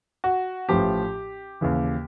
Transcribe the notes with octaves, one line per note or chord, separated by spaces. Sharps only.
F#4
A1 A2 F3 G4
D#2 C#3 E3